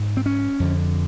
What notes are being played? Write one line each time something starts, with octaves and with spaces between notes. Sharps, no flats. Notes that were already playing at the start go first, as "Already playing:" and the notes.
Already playing: G#2
C4
C#4
F2 D3